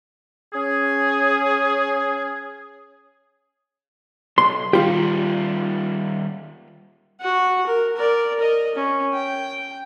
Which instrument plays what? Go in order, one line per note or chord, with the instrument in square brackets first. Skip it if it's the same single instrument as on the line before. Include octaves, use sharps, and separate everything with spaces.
[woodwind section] C#4 G#4
[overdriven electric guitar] B1 [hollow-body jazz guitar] C6
[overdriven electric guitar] D#3 G3 [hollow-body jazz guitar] F4 G4
[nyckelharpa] F#4 F#5
A#4
A#4 D5
A#4 D#5
C#4
G5